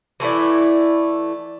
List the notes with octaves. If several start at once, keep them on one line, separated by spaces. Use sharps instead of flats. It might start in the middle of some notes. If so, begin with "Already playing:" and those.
E3 A3 E4 D5